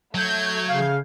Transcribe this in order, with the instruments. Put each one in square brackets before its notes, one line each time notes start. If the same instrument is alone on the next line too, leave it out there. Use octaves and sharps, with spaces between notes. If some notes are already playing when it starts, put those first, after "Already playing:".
[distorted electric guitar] F#3 [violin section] A3 G6 G#6
[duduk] C#3 [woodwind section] F5